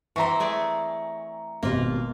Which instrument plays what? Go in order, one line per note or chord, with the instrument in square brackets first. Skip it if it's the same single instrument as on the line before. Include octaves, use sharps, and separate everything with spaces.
[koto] E3 C4 C5 [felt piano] A#5 C#6
[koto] A3 G#4 D5
[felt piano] G#1 B2 G4 [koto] A#3 F4